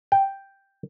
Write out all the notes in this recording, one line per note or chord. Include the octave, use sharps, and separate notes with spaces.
G5